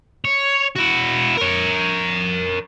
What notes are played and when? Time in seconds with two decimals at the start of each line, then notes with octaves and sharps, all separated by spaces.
0.25 C#5
0.76 E4 F#4
1.37 A#4 C#5